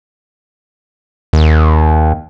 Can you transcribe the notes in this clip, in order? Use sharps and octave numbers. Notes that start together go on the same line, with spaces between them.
D#2